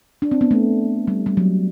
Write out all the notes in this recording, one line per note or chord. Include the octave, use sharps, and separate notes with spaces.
D4
C4
B3
A3
G3
G3
F#3